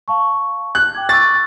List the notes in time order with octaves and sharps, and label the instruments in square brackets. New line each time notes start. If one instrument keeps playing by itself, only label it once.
[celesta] F5 A5 C#6
[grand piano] F#6
[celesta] G5 D6 G#6
[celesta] C#6 D6 E6 [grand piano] A6